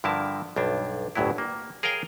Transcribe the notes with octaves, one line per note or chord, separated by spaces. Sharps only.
G2 D3 F3 E4 A#4 A5
B1 G2 D4
G1 D2 A2 F#3 E4
A#3
G#4 A#4 C#5 F5 G5 G#5